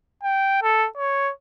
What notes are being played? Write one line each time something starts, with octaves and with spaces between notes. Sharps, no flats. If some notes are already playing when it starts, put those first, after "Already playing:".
G5
A4
C#5